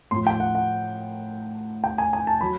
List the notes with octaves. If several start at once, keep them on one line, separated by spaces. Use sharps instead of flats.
A2 F3 C6
G5
F#5
F#5
G5
G#5
G#5
A5
F#3 B5